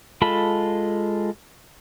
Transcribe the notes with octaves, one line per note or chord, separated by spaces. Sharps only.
G#3 F4 A4 A5 B5